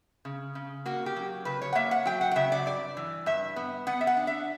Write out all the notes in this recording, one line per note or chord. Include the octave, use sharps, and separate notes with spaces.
C#3
C#3
A#3 F#4
G4
F#3
C#3 B4
C#5
F#5
A#3 E5
F#5
F#3 G5
F#5
F#5
C#3 E5
D5
G2 D5
E3
G2 E5
B3
B3 F#5
E5
F#5
D4
E5